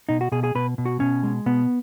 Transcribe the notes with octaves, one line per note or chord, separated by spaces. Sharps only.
B2 D#4
F#4
B2 G#4
G#4
B2 B4
B2
F#4
B2 C#4
G#3
B2 B3